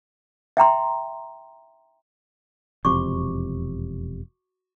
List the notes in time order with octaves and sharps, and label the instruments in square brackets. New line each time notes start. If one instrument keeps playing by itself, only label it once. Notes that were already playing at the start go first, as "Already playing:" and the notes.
[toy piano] E5 G5 A#5 C6
[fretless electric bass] E1 F2 C3 [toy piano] F#4 C#6 D6